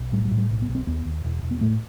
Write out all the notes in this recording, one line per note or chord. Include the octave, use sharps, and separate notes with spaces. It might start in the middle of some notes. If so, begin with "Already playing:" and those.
Already playing: B1
A2 G3
G3
A2
G3
B1
B3
B1
C4
D#2 B3
D#2
E1
E1
B3
A2 A3